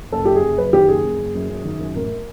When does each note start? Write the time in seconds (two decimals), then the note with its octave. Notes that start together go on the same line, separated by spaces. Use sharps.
0.12 F#1 A4
0.25 F#2 G4
0.36 G#4
0.43 F#1
0.58 F#2 B4
0.73 D#3 G4
0.89 F#1 G#4
1.04 F#1
1.19 F#1
1.34 F#2
1.49 F#2
1.64 D#3
1.80 F#2
1.95 A1 A#4